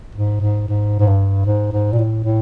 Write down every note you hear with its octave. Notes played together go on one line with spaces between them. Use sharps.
G#2
G#2
G#2
G#2
G2
G#2
G#2
A#2
A2
A2